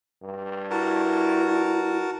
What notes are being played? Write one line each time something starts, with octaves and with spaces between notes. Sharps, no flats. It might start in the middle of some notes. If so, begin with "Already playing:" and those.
G2
E4 F#4 A#4 A5